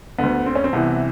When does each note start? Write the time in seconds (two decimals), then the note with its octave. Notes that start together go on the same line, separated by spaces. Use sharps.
0.18 D2 D3 B3
0.46 C4
0.55 C#4
0.64 C4
0.73 C2 C3 E3 B3